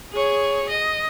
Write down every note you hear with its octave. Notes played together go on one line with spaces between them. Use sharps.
G#4 C#5
D#5